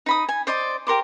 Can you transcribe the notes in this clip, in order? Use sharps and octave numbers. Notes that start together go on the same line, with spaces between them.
D#4 B5 D#6
G#5
C5 D5 D#5 C6
G4 A#4 C6 D6